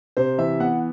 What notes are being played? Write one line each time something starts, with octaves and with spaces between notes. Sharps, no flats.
C3 C5
E3 E5
B3 F#5